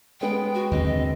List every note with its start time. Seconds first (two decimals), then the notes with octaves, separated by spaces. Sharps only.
0.21 G#3 B3 G5
0.54 F#4
0.71 D#2 D3 C4 D#5
0.85 D#5